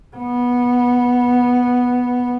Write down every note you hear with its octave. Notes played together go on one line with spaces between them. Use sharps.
B3